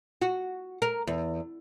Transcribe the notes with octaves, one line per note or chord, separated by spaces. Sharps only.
F#4
A#4
E2